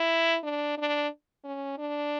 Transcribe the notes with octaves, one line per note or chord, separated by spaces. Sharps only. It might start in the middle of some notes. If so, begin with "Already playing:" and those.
Already playing: E4
D4
D4
C#4
D4